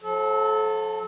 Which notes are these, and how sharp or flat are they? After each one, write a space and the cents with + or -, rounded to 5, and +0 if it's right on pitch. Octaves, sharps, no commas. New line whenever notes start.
F3 +40 A4 -25